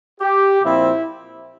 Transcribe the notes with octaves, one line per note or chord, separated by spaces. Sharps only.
G4
A#2 F3 C4 E4